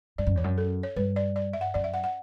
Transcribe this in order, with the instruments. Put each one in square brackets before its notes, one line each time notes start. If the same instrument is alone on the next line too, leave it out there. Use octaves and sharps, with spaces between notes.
[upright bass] G2 [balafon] D5
[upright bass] F#2
[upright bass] E2 [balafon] C#5
[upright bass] F#2
[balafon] A4
C#5
[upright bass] G2 [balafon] B4
[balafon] D5
D5
E5
F#5
[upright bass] F#2 [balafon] D5
[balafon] E5
F#5
F#5